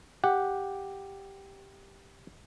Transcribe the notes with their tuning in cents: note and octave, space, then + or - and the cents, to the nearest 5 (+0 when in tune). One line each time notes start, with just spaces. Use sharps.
G4 +0 F#5 +0